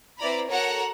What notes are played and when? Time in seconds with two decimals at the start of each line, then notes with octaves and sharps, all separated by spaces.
0.19 C4 E4 B4 D5 A#5 B5
0.49 F#4 A4 A#4 C#5 F#5 A#5